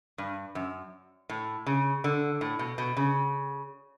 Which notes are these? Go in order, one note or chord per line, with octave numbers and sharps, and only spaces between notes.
G2
F#2
A2
C#3
D3
A2
B2
B2
C#3